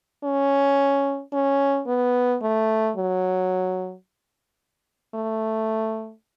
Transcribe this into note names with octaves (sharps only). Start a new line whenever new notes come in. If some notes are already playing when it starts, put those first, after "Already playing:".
C#4
C#4
B3
A3
F#3
A3